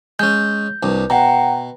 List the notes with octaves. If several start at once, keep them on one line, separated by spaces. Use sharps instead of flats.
G#3 C#4 G6
C2 G2
B2 F#5 G5 A#5